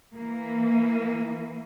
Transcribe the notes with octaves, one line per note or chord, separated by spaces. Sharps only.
E3 A#3